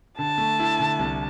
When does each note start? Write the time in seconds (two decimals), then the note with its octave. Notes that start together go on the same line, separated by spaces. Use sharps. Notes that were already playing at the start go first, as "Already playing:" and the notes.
0.18 D3 A5
0.38 A3
0.59 E4
0.80 D3
0.99 C2